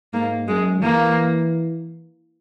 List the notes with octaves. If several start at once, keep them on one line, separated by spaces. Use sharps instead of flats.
G#2 A#3
F#2 G#3
E3 A#3